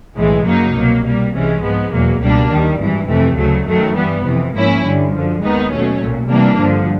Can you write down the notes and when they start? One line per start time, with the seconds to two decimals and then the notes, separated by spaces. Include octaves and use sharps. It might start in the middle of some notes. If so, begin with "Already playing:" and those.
0.16 B1 A2 E3 G#3
0.46 F#2 C#3 F#3 A#3 D#4
0.75 C2 B2 F#3 A#3
1.04 B2 G3 A#3
1.33 C2 C3 E3 G#3 C#4
1.62 G#2 F3 G#3 B3
1.92 E2 B2 F#3 A#3
2.21 C#2 B2 G3 A#3 D4
2.50 D#2 D#3 G3
2.79 G#1 G2 E3
3.09 F2 C3 E3 A3
3.37 D2 C#3 F#3 A3
3.67 F#2 D#3 F#3 A3
3.95 G2 E3 G3 B3
4.25 F2 C3 E3
4.54 G#2 F3 A#3 C#4 E4
4.84 G2 D3 G3
5.13 F#2 D3 F3
5.42 D#2 D#3 G#3 B3 D#4
5.71 B2 F#3 A3 C#4
6.01 B1 A#2 F#3
6.29 C3 E3 G3 A#3 D4
6.58 G2 D3 F3